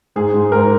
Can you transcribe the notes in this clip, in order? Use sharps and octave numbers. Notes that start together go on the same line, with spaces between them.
G#2 G#4
G#2
G#2 A#4